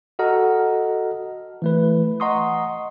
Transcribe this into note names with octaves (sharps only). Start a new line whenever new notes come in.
F#4 A4 D#5 F#5 A#5 F6
E3 A3 B4
D#5 F#5 A#5 C6 C#6 D#6